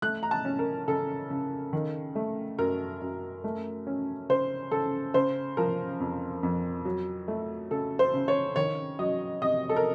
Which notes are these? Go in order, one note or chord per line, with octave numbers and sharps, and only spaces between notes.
A3 F#6
A#5
A5
C#4
A#4
C#3 A4
C#3
D#3
A3
F#2 A#4
F#2
A3
C#4
C#3 C5
C#3 A4
C#3 C5
F3 A#4
F2
F2
F#3
A3
C#3 A4
C5
C#3
C#5
D#3 C#5
F#3 D#5
C3 D#5
A4
A#4